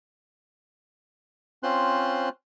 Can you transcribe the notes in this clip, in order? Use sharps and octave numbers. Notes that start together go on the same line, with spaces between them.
C4 C#4 F4 C5 C6 F#6